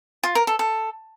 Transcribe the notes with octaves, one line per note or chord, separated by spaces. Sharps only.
F4
A#4
A4
A4